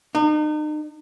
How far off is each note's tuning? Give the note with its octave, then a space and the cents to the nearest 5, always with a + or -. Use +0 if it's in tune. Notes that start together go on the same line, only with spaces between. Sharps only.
D#4 -40